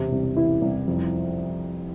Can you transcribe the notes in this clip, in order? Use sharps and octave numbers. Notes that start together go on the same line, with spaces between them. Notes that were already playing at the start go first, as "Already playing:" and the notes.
Already playing: E1 C3
C2
E3 E4
C2
F2